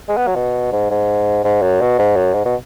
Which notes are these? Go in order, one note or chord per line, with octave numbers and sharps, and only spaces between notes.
G#3
B3
F#3
B2
G#2
G#2
G#2
F#2
B2
G#2
F#2
G#2
B2